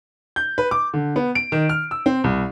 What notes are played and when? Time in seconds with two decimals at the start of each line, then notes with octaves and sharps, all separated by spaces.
0.36 G6
0.58 B4
0.71 D6
0.94 D3
1.16 B3
1.35 D7
1.52 D#3
1.69 F6
1.91 E6
2.06 C4
2.24 C2